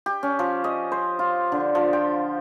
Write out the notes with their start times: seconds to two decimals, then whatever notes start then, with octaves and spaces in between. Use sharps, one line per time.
0.06 G4
0.23 C#4
0.39 F3
0.64 D#5
0.92 C5
1.19 F4
1.52 D3
1.75 F3
1.93 G5